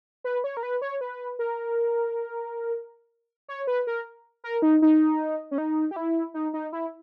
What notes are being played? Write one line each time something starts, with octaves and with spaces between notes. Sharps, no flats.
B4
C#5
A#4
B4
C#5
B4
A#4
C#5
B4
A#4
A#4
D#4
D#4
C#4
D#4
G4
E4
D#4
D#4
E4